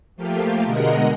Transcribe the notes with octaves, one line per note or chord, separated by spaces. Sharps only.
F3 A3 A#3 F4 G4
B2 D3 G#3 A#4 D#5 F#5